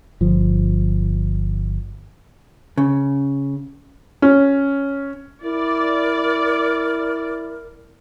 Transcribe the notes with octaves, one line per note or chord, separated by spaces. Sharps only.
G1 F3
C#3
C#4
E4 A#4 D5